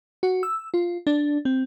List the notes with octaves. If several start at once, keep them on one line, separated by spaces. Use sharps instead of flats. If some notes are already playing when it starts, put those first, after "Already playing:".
F#4
E6
F4
D4
C4